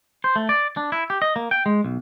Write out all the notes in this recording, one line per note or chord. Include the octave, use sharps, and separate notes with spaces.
C5
A3
D5
D4
E4
G4
D#5
A#3
G5
G#3
B1